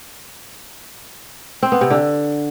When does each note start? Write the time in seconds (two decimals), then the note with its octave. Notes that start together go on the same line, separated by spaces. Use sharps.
1.63 C4
1.72 B3
1.81 C3
1.90 D3